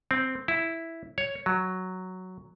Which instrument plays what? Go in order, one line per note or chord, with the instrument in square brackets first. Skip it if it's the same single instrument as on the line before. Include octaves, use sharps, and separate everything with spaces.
[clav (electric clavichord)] C4
E4
C#5
F#3